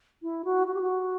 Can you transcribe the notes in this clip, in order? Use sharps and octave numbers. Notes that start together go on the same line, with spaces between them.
E4
F#4
F#4
G4
F#4